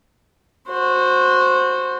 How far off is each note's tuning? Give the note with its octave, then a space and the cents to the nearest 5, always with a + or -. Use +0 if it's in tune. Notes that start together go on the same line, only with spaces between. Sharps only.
F#4 -15 C5 +0